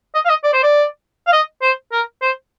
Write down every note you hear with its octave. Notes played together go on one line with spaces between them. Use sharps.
D#5
F5
D#5
D5
C5
D5
F5
D#5
C5
A#4
C5